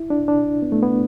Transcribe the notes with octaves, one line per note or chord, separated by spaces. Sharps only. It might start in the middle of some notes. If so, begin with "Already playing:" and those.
Already playing: E4
D4
D4
B3
A3
B3